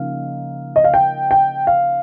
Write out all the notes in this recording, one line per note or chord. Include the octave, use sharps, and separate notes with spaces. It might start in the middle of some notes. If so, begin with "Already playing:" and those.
Already playing: C#3 F3 A#3 D#4 F5
D#5
F5
G5
G5
F5